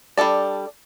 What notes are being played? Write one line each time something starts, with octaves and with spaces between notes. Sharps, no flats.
G3 D4 A4 D5